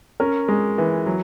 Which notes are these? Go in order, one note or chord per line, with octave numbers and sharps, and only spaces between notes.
C#4 A#4
G#3
E3
F#3